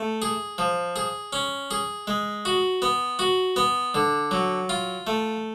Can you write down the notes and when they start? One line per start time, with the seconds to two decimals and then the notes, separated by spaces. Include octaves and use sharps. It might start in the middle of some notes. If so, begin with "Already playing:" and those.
Already playing: A3
0.22 G#4
0.58 F3
0.96 G#4
1.33 C#4
1.71 G#4
2.07 G#3
2.45 F#4
2.82 B3
3.19 F#4
3.56 B3
3.94 D3
4.31 F#3
4.69 F4
5.07 A3